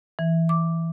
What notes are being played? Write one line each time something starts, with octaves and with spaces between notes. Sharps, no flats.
E3
D6